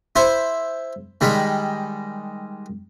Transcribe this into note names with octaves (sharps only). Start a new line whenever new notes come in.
E4 C5 E5
D#3 G3 G#3 B5